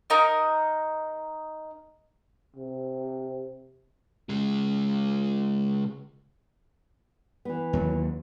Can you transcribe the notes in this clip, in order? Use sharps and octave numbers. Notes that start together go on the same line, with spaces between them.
D#4 A#4 D#5
C3
C#3 G#3
E3 B3
D#2 F#3